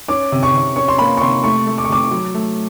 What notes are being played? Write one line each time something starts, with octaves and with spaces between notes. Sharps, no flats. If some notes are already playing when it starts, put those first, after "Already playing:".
C#4 D6
C3
C#6
C3
C#4 C#6
C6
A#3 B5
C#6
C3 C6
A3 C#6
A3
D6
C#6
C3 D6
F#3
A3